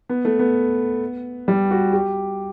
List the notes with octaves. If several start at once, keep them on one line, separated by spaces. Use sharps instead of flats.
B3
A3
B3
G3
F#4
G4